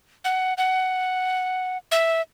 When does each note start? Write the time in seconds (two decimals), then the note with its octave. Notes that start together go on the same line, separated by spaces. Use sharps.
0.25 F#5
0.58 F#5
1.92 E5